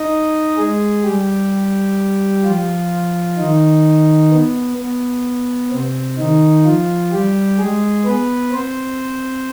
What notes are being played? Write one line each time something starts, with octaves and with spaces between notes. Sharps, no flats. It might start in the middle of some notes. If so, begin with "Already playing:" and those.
Already playing: D#4 D#5
G#3 G#4
G3 G4
F3 F4
D#3 D#4
B3
B3
C3 C4
D#3 D#4
F3 F4
G3 G4
G#3 G#4
B3 B4
C4 C5